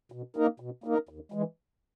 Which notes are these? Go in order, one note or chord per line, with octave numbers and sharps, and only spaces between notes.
B2
A#3 D#4 A#4
B2
A#3 D#4 A#4
D#2
E3 G#3